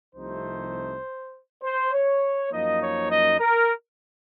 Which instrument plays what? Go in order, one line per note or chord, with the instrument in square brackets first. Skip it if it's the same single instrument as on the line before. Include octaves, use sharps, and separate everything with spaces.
[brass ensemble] C2 C3 F3 A3 D#4 C5
C5
C#5
F#2 F3 A#3 D#4 D#5
C#5
D#5
A#4